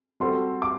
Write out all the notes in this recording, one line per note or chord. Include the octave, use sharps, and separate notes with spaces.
G3 C4 F#4 A4 C6
D6